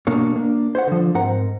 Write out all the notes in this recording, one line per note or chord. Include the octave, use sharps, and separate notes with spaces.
B2 A#3 D4 C#5
A#3 D4
C5 C#5 E5 F#5
D3 F3
G#2 C4 A#4 F#5 A#5